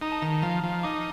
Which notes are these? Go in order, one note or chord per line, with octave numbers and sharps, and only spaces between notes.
D#4 A#5
A5
D#3 A#5
A5
F3 A#5
F3
D#4 D6